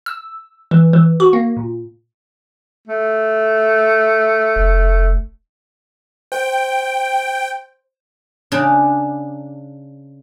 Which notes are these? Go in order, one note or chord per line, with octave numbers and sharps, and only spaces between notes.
E6
E3
E3
F#4
A#3
A#2
A3
F1
C5 G5
C#3 D4